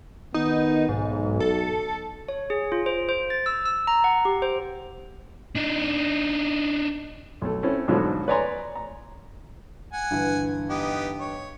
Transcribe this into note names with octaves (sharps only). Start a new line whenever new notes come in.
D#3 B3 D#4
B1 G#2
A4
C#5
G#4
F4
C5
C5
A6
E6
E6
A#5
F#5
G4
C5
D4 D#4
B1 A3
A3 C4 C#4 E4
G#2 B2 D3 F3 F#3 A3
B4 C#5 D5 G#5 A#5 C6
A#5
F#5 G#5
G2 D3 E3
B3 D#4 G4
C#5